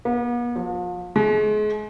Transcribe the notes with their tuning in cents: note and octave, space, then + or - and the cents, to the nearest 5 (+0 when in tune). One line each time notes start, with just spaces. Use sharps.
B3 -45
F3 +35
G#3 +35